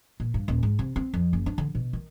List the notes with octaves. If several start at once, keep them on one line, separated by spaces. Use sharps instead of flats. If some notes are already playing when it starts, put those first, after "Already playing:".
A#2
G2
D#1
G#2
C3
C4
F2
F#1
D4
D3
B2
D#3